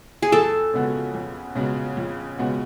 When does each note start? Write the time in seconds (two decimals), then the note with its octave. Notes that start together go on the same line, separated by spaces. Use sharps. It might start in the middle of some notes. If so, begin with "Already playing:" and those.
0.22 G#4
0.32 F2 A4
0.74 C#3 G#3 B3 F#4
1.14 F2
1.55 C#3 G#3 B3 F#4
1.97 F2
2.38 C#3 G#3 B3 F#4